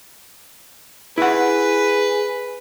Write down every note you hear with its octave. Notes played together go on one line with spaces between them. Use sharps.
E4 G#4 B4 F#5